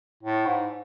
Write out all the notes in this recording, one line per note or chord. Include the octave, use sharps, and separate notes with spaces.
A2
G#2